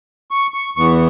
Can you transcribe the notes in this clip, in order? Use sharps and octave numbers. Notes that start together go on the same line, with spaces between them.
C#6
C#6
E2 E3 B3 C#6